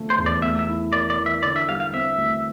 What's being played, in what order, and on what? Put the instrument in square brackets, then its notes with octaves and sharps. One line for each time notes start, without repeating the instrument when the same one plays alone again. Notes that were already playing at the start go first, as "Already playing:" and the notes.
Already playing: [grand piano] D3 F3 A3
[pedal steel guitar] C5
[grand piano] E2
[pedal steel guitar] D5
[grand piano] A3 [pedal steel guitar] E5
[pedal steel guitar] E5
[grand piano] E4
[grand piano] A#4 [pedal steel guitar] D5
[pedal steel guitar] D5
[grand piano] E3
[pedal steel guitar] E5
[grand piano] D3 [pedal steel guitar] D5
[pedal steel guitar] E5
[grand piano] G3 [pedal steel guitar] F5
[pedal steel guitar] F5
[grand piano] C4 [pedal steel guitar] E5
[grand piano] D2